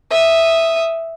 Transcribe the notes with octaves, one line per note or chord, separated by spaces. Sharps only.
E5 D#6